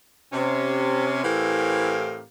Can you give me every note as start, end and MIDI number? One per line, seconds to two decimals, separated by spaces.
0.32 1.23 48
0.32 1.23 61
1.24 2.23 45
1.24 2.23 52
1.24 2.23 60
1.24 2.23 67
1.24 2.23 70
1.24 2.23 77